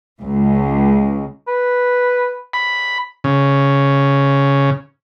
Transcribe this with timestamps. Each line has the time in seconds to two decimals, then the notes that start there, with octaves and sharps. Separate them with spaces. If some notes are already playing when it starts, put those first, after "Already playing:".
0.21 C#2
1.48 B4
2.53 B5
3.24 C#3